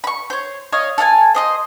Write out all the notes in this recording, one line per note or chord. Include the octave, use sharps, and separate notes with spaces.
B5 C#6
C5 C#5
C#5 D#5 F5
A4 F5 F#5 G#5
C5 D#5 C6